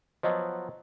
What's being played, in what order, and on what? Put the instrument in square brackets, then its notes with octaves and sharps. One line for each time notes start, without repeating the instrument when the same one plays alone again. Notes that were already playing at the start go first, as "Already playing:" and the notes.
[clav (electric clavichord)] F3 F#3 B3 [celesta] C5 D#5